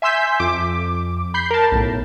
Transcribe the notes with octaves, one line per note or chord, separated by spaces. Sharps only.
E5 G#5 C6 E6 G6 B6
F2 D6
B5 G6 C7
A#4 A5
B1 A2